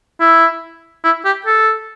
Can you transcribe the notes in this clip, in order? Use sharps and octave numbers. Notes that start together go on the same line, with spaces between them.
E4
E4
G4
A4